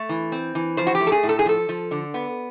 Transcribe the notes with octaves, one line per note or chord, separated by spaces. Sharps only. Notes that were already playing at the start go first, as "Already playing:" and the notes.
Already playing: A3
E3
C4
E3
F3 C5
F#4
G4
A3
A4
G#4
A2
A4
G#4
F3 A4
F3
D3
B3